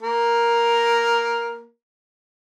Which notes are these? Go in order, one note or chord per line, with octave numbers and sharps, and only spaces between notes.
A#3 A#4